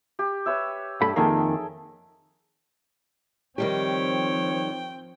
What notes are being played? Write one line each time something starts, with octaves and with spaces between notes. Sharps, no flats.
G4
B4 C#5 E5
G2 A4 B5
F2 D#3 A#3 G#4 A4 G5
D#3 F3 G3 C4 G4 C#5 G5